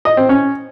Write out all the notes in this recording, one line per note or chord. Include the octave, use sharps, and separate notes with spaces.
D#5
C4
C#4